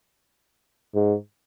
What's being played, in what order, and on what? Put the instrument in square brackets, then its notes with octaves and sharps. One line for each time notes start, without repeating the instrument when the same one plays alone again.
[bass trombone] G#2